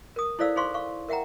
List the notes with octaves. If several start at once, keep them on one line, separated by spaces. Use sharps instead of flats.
A#4 D#6
E4 A4 C5 D5 F5 E6
D#4 G#4 C5 F5 C6 C#6
F5 C#6
A#4 E5 F#5 G5 A#5